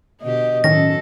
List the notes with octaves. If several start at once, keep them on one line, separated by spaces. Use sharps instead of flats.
B2 D3 G4 D#5
A2 D#3 F#3 C#4 A4 A#6